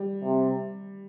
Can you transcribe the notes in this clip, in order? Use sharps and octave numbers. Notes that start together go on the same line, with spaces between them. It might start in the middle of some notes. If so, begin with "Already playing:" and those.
Already playing: G3
C3